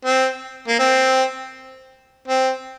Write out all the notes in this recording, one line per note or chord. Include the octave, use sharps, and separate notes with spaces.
C4
A#3
C4
C4